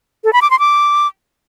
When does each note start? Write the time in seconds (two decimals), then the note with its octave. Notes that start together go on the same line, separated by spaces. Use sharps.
0.24 A4
0.33 B5
0.42 D6
0.51 C6
0.59 D6